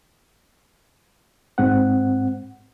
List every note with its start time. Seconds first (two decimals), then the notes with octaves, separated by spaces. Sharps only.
1.58 G#2 C4 F#5